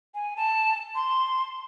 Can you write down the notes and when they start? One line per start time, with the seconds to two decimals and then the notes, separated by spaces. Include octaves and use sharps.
0.15 G#5
0.37 A5
0.95 C6